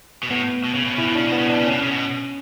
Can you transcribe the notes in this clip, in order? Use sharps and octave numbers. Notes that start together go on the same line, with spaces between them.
B2
A2 B3
B2
C#3
B2
C#3 E4
B2
C#3 D4
B2 B3
C#3
B2 D4
C#3
B2 C#4
C#3
B2